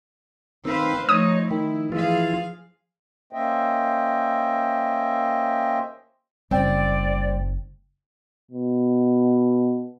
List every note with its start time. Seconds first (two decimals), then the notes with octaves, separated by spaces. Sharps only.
0.65 D#3 C4 B4 C5 F5
1.09 F3 A3 D#4 C#5 D#6
1.51 D#3 E4
1.92 E3 F3 F4 G#4 F5
3.33 A#3 C#4 C5 D#5 E5 G5
6.51 F#1 G3 C4 D5 G5
8.51 B2